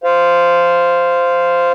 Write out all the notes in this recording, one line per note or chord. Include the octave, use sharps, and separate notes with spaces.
C5 F5